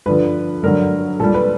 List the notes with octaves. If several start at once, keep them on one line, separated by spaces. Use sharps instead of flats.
G2 D3 F3 B4
G2 D3 F#3 A#4
A#2 G3 A4
B4